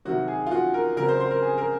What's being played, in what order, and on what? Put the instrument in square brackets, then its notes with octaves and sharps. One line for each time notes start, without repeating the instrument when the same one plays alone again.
[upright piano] C3 D#3 F#3 F#4
G#4
F4
F#4
A#4
C#3 F#3 C4 A#4
C5
C5
A#4
G#4
A#4